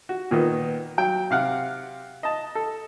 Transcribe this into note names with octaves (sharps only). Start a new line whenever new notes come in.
F#4
A#2 D#3 A#3 B3
F#3 G5
C3 F5 F#5
D#5 A5
A4